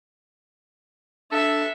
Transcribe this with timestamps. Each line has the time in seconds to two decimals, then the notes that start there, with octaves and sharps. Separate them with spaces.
1.32 D4 A4 E5